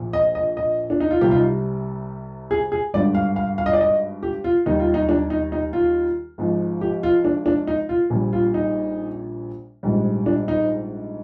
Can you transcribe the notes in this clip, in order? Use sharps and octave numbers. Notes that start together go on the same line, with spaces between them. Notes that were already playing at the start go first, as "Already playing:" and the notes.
Already playing: A#1 A#2 F3
D#5
D#5
D#5
D4
D#4
F4
C2 C3 G3 G4
F4
D#4
G#4
G#4
G#1 G2 D3 D5
F5
F5
F5
D#5
D5
D#5
G4
F4
D#2 D#3 G3 D#4
F4
D#4
D4
D#4
D#4
F4
G#1 G#2 F3
G4
F4
D4
D4
D#4
F4
A#1 A#2 G3
F4
D#4
A#1 G#2 G3
D4
D#4